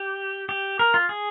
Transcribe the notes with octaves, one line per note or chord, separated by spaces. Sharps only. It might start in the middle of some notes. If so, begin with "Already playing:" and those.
Already playing: G4
G4
A#4
F4
G#4